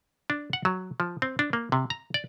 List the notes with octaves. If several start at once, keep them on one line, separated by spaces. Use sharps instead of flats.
D4
F#5
F#3
F3
C4
D4
A#3
C3
A#5
D5